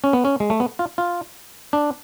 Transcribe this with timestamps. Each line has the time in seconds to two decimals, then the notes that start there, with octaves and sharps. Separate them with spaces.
0.04 C#4
0.13 B3
0.25 C#4
0.40 G#3
0.50 A3
0.60 B3
0.79 F4
0.98 F4
1.73 D4